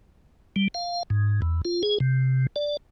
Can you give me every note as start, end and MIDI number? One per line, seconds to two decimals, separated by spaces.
0.56 0.68 55
0.74 1.03 77
1.10 1.41 44
1.42 1.61 40
1.65 1.82 65
1.83 1.98 68
2.00 2.47 48
2.56 2.77 74